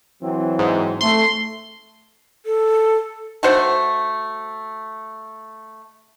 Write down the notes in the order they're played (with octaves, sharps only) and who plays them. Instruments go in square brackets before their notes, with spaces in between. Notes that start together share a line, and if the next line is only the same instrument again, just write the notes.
[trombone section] E3 F#3 C4
[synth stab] G#2
[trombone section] A3 [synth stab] C6
[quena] A4
[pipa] A3 F#4 C5 F#5